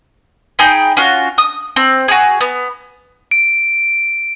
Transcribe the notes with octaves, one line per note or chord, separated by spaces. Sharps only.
D#4 G#4 G5 B5
C#4 F4 F#4
D#6
C4
F#4 G#4
B3
D7